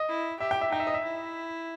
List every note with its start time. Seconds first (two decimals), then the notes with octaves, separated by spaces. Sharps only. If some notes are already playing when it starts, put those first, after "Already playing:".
Already playing: D#5
0.09 E4
0.40 G4 E5
0.51 G5
0.61 E5
0.72 D#4 G5
0.80 E5
0.87 D#5
0.94 E5
1.04 E4